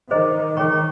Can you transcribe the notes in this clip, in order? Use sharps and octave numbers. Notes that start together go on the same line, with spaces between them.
D#3 G#4 C5 D#5 A#5
D#3 G#4 C#5 G5 A#5 C#6